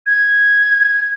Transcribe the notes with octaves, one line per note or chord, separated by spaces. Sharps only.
G#6